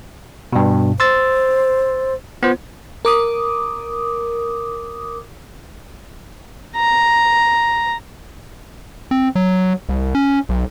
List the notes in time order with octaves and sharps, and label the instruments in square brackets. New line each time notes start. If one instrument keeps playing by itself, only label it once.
[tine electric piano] G2 B2
[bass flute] C5 [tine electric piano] C6 E6 A6
[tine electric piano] B3 C5 [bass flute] F4
[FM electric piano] A#4 D6 D#6
[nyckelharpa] A#5
[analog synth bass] C4
F#3
C2
C#4
B1